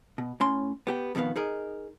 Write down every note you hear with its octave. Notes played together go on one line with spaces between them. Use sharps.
B2
A2 C#4 C6
B3 G4 G5
F2 B2 D#3 B3 F5
D#4 G#4 A#4 D#5